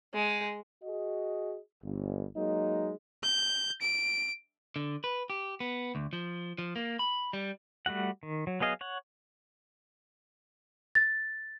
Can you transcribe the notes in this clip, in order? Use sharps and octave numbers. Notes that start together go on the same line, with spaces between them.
G#3
F#4 G#4 D#5
G1
F#3 G#3 A#3 D#4
G6
D7
D3
B4
G4
B3
D2
F3
F3
A#3
B5
G3
G3 A3 F#4 F#5
D#3
F#3
F#3 B3 G#4 D#5 F5
C#5 F#5
A6